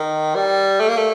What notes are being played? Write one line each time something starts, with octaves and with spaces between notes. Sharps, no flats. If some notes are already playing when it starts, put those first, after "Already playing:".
Already playing: D#3
G3
A3
A#3
A3